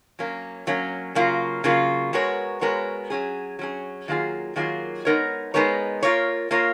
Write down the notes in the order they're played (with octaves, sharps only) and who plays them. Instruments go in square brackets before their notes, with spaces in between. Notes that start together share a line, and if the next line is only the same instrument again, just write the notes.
[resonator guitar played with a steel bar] F#3 A#3 C#4
F#3 A#3 C#4
C#3 F#3 A#3 F4
C#3 F#3 A#3 F4
G#3 B3 F#4 A#4 C#5
G#3 B3 F#4 A#4 C#5
F#3 C#4 G#4
F#3 C#4 G#4
D#3 F#3 A#3 F4 G#4
D#3 F#3 A#3 F4 G#4
G#3 B3 D#4 A#4 C#5
G#3 B3 D#4 A#4 C#5
A#3 F4 A#4 C#5
A#3 F4 A#4 C#5